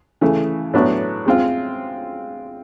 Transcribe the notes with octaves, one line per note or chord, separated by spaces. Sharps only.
C#3 E3 A3
A2 F#3 B3 D4 F#4
G#3 C4 F4